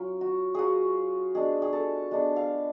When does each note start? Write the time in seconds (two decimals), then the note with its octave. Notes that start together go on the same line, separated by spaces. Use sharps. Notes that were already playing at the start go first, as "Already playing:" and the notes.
Already playing: F#3 C#4 F4
0.21 F#4
0.55 F#3 C#4 F4 F#4 G#4
1.35 G#3 B3 D4 G#4
1.62 G#4
1.73 A4
2.11 G#3 B3 D4
2.36 F5